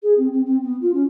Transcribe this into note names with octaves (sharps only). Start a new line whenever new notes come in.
G#4
C4
C4
C4
B3
F4
C#4